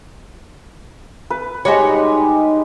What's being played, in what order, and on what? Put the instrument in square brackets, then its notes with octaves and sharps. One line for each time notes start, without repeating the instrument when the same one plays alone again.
[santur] B4
[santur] G3 G#3 G4 [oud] D#4 F#4 C#5